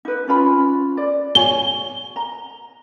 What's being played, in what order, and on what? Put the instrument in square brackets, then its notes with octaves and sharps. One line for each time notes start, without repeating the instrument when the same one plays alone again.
[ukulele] D#4 B4
C#4 F4 B5
D5
[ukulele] C#5 G#5 [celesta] G7
[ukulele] A#5